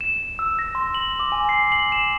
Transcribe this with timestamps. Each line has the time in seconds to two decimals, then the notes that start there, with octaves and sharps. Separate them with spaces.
0.01 E7
0.39 E6
0.59 A#6
0.75 C6
0.94 F#7
1.20 D6
1.32 G#5
1.49 C7
1.72 F#7
1.92 E7